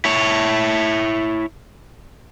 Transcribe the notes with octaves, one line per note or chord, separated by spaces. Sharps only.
E4 C#5